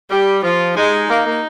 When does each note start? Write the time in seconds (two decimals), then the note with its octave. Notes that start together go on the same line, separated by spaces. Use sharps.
0.10 G3 G4
0.43 F3 F4
0.76 G#3 D#4
1.10 A#3
1.26 A#3